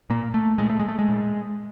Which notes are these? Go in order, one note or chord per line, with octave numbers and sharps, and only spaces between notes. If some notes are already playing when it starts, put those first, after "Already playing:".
A#2 A#3
A3
A#2 G#3
A3
G#3
A3
G#3
A#2